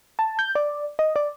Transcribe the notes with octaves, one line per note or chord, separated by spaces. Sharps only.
A5
G6
D5
D#5
D5